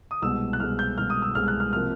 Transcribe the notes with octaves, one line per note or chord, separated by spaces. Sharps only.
D#6
C2 B2 G#3 E6
F#6
C2 B2 G#3 F6
G6
C2 B2 G#3 F6
D#6
E6
C2 B2 G#3 F6
F#6
F6
C3 F3 A#3 F6